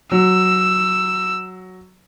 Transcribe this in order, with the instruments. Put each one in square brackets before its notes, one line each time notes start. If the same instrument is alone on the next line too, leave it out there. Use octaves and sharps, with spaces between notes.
[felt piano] F#3 [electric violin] E6